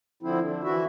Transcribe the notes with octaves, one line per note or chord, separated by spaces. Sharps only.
D3 F3 C4 E4
D3
E3 E4 F#4 E5